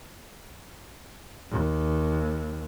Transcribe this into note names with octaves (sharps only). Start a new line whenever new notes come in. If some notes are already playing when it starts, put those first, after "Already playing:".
D#2